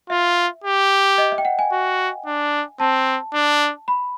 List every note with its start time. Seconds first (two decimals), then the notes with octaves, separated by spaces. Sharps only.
0.10 F4 E5
0.64 G4
1.18 D#5
1.32 E5
1.38 G5
1.45 F#5
1.59 G#5
1.72 F#4
2.26 D4
2.80 C4 A5
3.34 D4
3.88 B5